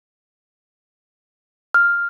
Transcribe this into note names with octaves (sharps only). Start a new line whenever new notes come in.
F6